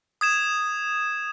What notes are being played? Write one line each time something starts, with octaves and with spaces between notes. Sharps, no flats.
D#6 G#6 E7